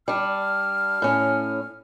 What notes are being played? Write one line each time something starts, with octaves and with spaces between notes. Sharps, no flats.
G3 D4 F6
A2 C#4